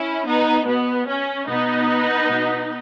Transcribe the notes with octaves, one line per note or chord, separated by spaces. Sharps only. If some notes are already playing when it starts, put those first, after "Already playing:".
Already playing: C#4 E4
B3 D#4
B2 B3
C#4
B2 B3 D#4
B2